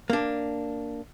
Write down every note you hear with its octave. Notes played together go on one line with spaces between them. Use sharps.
A#3 D4